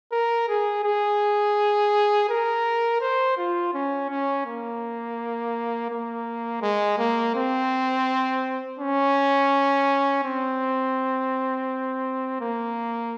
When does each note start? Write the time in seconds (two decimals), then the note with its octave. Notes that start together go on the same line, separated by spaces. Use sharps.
0.12 A#4
0.48 G#4
0.84 G#4
2.29 A#4
3.01 C5
3.37 F4
3.74 C#4
4.10 C#4
4.46 A#3
5.90 A#3
6.62 G#3
6.98 A#3
7.35 C4
8.80 C#4
10.24 C4
12.41 A#3